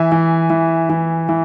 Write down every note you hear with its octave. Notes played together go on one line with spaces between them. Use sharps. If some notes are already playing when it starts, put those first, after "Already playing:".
Already playing: E3 E5 G#5
E3
E3
E3
E3